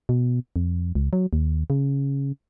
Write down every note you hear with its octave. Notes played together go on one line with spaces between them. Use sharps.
B2
F2
C#2
F#3
D#2
C#3